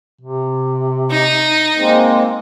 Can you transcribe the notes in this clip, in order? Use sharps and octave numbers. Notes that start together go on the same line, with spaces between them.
C3
D#4
G#3 A#3 C4